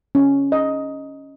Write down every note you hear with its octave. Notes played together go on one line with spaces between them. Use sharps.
C#4
D#5